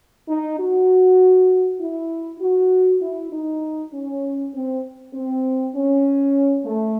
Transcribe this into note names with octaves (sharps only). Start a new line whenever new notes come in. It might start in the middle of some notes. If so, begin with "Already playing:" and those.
D#4
F#4
E4
F#4
E4
D#4
C#4
C4
C4
C#4
A3